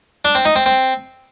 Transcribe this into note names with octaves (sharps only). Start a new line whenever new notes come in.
D4
C4
D#4
C4
C4